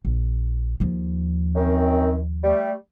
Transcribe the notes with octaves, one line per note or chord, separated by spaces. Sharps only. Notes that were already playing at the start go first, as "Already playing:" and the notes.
A#1
D#2 F3
F#2 D#3 C4
G3 A3